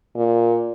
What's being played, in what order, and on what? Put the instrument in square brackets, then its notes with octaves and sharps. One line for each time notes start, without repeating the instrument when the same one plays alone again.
[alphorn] A#2